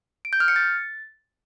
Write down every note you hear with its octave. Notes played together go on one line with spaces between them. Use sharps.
D7
G6
F6
C#7
A6